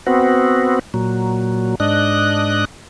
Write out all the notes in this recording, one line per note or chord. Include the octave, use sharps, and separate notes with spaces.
B3 C4 F#4
A#2 F#3
G#2 D4 D#5 F#6